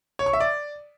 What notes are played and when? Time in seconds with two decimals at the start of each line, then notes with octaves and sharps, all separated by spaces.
0.19 C#5
0.26 C#6
0.33 E5
0.40 D5